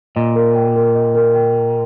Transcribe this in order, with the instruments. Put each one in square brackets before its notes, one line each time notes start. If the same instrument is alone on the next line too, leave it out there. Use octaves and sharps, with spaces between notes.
[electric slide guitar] A#2 [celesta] D#5
[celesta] A#4
G5
A#4
D#5
A#4
G5